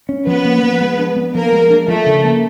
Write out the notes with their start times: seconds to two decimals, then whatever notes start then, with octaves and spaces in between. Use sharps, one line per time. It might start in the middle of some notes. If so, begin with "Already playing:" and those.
0.09 C#4
0.27 F3 B3 B4
0.45 A#3
0.63 F3
0.81 G#3
0.98 D4
1.16 B3
1.34 F3 A#3 A#4
1.52 G#3
1.70 D4
1.88 F3 A3 A4
2.06 C#3
2.24 A#3